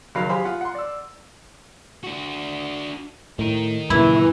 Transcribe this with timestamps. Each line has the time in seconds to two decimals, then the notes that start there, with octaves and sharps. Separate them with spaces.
0.15 F#1 D#3 F#3 F5 B5 C7
0.29 G4 G#4 C5 F5 B5
0.45 F4 F#5
0.61 F#5 C6
0.75 D5 E6
2.03 D4 F#4
3.39 A2 D#4 A#4
3.90 F#2 A#2 C#3 E3 E4